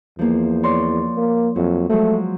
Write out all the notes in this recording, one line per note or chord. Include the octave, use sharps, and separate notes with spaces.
E2 F3 A#3
C#5 D5 C6
A#3
F2 F#3
F3 F#3 G#3 A3